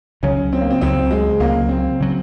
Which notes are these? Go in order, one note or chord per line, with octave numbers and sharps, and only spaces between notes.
C#2 C#3 F#3 C#4
C4
A#3
C4
C#2 C#3 F#3 C4
G#3
C#2 C#3 F#3 A#3
C4
C#3 F#3